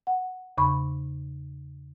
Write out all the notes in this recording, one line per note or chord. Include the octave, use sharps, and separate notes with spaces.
F#5
E2 C#3 B5 C#6